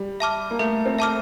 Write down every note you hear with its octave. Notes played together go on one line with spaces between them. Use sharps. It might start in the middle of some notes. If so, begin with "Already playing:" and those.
Already playing: G3
E5 A5 D6 F6
A#3
A3 A4
C4
E5 A5 D6 F6